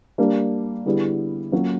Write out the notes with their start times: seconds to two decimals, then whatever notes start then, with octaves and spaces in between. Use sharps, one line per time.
0.18 G3 A#3 D4
0.86 D3 G3 B3 E4 G#4
1.52 F#3 A#3 C#4 F4